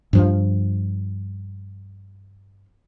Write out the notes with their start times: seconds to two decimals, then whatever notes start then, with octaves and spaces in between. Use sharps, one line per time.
0.13 G2 F3